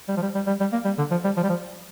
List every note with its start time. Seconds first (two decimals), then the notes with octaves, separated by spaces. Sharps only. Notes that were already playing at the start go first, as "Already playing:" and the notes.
0.08 G3
0.17 F3
0.22 G3
0.35 G3
0.47 G3
0.60 G3
0.72 A#3
0.85 G3
0.98 D3
1.11 F3
1.24 G3
1.37 F3
1.43 G3
1.49 F3